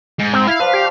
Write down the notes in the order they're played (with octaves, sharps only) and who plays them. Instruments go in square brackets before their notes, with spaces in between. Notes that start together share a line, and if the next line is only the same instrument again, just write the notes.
[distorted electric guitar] G#2
[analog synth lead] C4
[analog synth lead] E4 [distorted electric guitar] F5
[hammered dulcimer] F3 D5 [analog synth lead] B4
[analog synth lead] G4